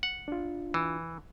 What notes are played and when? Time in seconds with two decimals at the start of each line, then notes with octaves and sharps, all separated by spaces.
0.03 F#5
0.28 D4 F4
0.74 E3